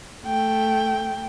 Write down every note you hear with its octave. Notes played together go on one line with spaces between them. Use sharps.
A3 G5